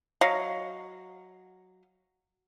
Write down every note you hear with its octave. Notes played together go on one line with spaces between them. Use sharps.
F#3 D#5 F5